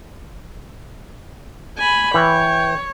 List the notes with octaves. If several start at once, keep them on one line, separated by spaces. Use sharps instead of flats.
G#5 B5
E3 C#5 G5